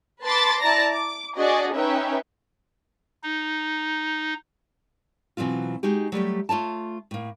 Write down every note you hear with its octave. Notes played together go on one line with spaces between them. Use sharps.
B4 A5 B5 C6 D6 A6
E4 D5 A5 A#5 A#6
D6
D4 F#4 G#4 D5 D#5
C#4 D#4 B4 E5 G5
D#4
B2 E3 F#3 C4 F4
G#3 D#4 F#4 G4
F#3 G3 A3 G4
A3 F4 C#5 A5
A2 A#3